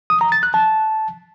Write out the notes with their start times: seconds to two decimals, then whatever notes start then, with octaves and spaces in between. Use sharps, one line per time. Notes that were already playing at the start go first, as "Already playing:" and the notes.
0.10 D#6
0.21 A#5
0.32 A6
0.43 F#6
0.54 A5